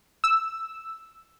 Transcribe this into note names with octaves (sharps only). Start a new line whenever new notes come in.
E6